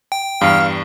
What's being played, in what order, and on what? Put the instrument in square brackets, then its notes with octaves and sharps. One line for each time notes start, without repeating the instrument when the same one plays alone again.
[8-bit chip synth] G5
[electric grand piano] E2 G2 [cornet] F5